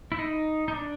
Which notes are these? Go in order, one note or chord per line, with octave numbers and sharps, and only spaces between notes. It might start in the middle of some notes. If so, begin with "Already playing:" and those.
E4
D#4
D#4
D4